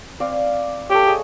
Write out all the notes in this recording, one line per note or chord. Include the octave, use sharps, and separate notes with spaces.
C4 D5 F5
G4 A4 C#5
G#4 A4 D#5